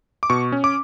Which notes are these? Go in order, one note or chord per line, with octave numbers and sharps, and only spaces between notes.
D6
B2 C#6
C#4
D6